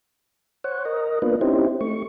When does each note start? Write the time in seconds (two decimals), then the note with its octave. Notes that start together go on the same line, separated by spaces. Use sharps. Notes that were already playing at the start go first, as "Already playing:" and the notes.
0.64 C5 C#5 F#5
0.85 A#4 D#5
1.22 A#3 B3 D4 F4 B4
1.41 C4 C#4 D#4 E4 G4 C5
1.81 A3 C#6